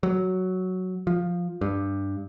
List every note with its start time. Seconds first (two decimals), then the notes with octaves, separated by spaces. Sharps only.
0.03 F#3
1.07 F3
1.61 G2